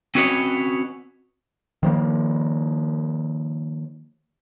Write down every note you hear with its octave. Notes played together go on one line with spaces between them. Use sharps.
C4 C#4 F#4 B4 C#5 D#5
D#3 F3 A#3